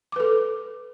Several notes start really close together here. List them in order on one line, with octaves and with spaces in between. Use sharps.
D6 B4 A4